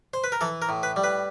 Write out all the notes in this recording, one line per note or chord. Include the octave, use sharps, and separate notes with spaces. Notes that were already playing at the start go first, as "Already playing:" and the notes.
C5
B4
A#4
E3 A4
A#4
A2
B4
G3
B4